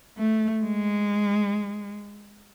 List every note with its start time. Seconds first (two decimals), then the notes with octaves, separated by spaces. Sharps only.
0.18 A3
0.63 G#3